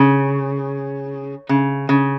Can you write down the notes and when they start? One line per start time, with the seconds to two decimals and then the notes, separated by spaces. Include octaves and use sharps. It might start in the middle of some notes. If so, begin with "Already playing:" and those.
Already playing: C#3
1.49 C#3
1.89 C#3